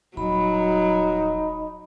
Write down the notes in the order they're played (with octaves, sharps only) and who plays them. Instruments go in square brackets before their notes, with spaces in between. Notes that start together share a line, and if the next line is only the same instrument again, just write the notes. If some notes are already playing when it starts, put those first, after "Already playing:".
[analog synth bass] D#1 [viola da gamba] F#3 [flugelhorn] D#4 [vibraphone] B5